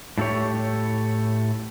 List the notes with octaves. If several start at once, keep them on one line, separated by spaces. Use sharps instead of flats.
A2 A3 E4 G4 C#5